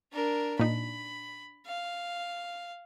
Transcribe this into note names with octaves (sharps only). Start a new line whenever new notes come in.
D4 A#4
A#2 D#4 B5
F5